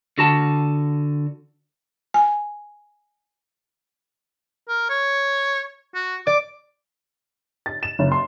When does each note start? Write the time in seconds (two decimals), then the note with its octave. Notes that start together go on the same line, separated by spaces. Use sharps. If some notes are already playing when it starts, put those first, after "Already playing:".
0.18 D3 F#4 A5
2.14 G#5
4.69 A#4
4.90 C#5
5.95 F#4
6.27 D5 D6
7.66 A6
7.83 E7
7.99 F#1
8.12 C6